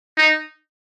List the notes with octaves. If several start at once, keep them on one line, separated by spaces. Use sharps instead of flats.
D#4